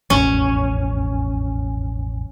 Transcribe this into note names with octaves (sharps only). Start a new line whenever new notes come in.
E1 A1 F2 C#4